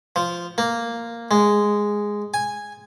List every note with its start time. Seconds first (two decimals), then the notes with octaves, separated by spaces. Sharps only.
0.16 F3
0.58 A#3
1.31 G#3
2.34 G#5